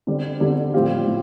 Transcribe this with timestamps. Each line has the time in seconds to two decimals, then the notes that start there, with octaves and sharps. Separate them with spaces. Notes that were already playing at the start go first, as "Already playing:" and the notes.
0.07 D3 G3 C4 G4 D5
0.40 D3 G3 C4 G4 D5
0.74 A2 F3 C4 G4 F5
1.07 A2